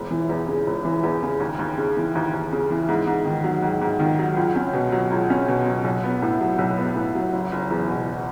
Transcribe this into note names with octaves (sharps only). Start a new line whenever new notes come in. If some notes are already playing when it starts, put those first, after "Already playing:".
Already playing: E1
E3
E2
C#3
E1
E3
E2
C#3
D#2
D#2
C#3
E3
D#2
D#2
C#3
E3
G#2
G#2
D#3
F#3
G#2
G#2
D#3
F#3
C#2
C#4
B2
F#3
C#2
C#4
B2
F#3
B1
B3
A2
F#3
B1
B3
A2
F#3
F#1
F#1
E2
B2